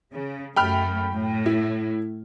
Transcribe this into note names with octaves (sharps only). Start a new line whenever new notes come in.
C#3
F#2 A3 G5 B5 F6
A2
E4